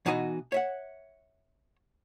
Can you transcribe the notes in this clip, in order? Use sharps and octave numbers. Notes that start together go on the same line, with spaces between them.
B2 E3 D#4 F#4 D#5 G#5
C#5 E5 F#5